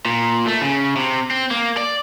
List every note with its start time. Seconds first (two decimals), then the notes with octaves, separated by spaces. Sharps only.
0.05 A#2
0.47 A3
0.62 C#3
0.96 C3
1.31 C4
1.51 A#3
1.77 D5